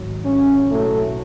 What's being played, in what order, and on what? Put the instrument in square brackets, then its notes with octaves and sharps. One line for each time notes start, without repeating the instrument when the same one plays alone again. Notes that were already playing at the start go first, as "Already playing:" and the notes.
Already playing: [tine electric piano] G#1 G#2 F#3
[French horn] C#4
[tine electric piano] B1 A2 F#3 [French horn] A3